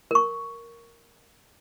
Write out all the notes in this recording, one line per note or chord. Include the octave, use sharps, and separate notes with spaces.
A#4 C#6